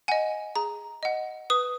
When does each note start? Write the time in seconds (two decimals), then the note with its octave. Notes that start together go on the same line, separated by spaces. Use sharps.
0.08 D#5 F#5 G#5
0.56 G#4 A#5
1.03 D#5 F#5
1.50 B4 D#6